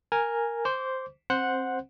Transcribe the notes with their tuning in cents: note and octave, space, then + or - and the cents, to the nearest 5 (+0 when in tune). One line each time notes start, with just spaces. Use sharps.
A#4 +0 G#5 -5
C5 +0 D6 -35
C4 +25 C5 +0 F#5 -10